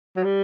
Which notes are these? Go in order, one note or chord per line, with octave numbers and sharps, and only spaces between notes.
F#3
G3